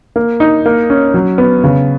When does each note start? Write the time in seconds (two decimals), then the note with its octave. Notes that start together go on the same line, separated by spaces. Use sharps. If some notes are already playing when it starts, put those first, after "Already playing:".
0.16 A#3
0.40 D#4
0.66 A#3
0.90 C#4
1.14 F#3
1.38 B3
1.64 C#3